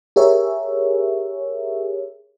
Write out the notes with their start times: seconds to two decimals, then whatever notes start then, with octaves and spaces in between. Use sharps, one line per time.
0.16 G4 G#4 A#4 C#5 E5